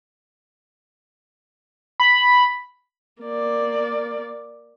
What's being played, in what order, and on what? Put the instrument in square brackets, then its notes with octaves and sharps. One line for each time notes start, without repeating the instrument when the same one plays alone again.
[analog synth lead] B5
[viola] A#3 D5